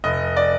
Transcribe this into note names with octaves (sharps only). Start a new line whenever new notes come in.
F1 D#5
D5